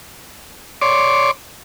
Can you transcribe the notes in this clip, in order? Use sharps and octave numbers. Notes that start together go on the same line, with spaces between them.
C#5 D5 C6 D6